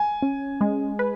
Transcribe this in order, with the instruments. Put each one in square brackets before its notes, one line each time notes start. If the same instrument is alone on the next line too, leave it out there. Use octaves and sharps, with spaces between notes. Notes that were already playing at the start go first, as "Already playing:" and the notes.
Already playing: [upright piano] G#5
[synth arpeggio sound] C#4
G#3
B4